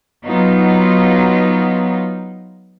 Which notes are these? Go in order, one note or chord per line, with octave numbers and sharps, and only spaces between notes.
F#3 B3 D#4 F4